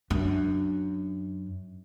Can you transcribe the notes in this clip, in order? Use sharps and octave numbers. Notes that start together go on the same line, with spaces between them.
F#2 D4